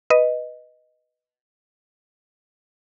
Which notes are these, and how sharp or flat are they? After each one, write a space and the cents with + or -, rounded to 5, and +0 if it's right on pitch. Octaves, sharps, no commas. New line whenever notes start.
B4 +0 D#5 +0